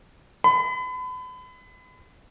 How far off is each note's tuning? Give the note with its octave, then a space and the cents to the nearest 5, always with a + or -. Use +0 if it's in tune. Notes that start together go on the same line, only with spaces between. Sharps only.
B5 +35